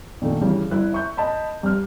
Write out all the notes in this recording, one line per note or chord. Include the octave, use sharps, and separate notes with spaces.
A#2 D#3 A3 D4
G2 C#3 E3
G1 E4 F#6
E5 C#6 G6
D#5 A5 B5
G2 F6